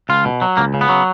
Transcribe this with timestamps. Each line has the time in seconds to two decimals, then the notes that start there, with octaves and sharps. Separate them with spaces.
0.09 C#2 F4
0.25 B2
0.42 F#3
0.57 C#2 A#3
0.74 C#3
0.81 B3
0.89 F#3